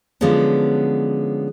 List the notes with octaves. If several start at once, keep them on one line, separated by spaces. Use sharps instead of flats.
D3 F3 F#3 G#3 B3 C#4